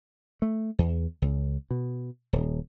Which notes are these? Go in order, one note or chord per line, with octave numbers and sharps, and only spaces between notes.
A3
E2
C#2
B2
D#1